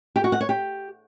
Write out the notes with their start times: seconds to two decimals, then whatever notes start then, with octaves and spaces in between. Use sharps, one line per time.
0.16 G4
0.24 F#4
0.32 F#5
0.41 C#5
0.49 G4